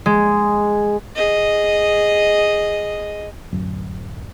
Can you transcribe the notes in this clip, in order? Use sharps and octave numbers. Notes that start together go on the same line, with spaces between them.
G#3
G#4 D#5
D1 F#2